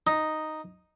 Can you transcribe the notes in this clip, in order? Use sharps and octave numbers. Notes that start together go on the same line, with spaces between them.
D#4